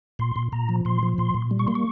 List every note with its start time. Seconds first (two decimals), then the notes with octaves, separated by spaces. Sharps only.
0.19 A#2 C6
0.36 A#2
0.52 A#2 A#5
0.69 F3
0.85 A#2 C6
1.03 F3
1.18 A#2 C6
1.34 A#2
1.51 G3
1.59 C#6
1.67 A#3 C6
1.75 C#6